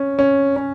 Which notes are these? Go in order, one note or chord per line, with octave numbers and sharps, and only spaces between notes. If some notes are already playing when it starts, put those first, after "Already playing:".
Already playing: C#4
C#4
C#4